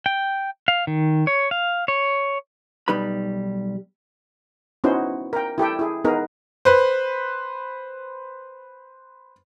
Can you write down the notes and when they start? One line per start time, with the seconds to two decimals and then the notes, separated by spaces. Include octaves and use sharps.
0.06 G5
0.68 F5
0.87 D#3
1.27 C#5
1.51 F5
1.88 C#5
2.88 B1 G3 D#4 B4 B5
4.84 B3 C#4 D#4 E4 F#4 C5
5.33 A#4 G5
5.58 E4 G4 A4 G5
5.79 E4 G#4
6.04 B3 D#4 G#4 A#4
6.65 B4 C5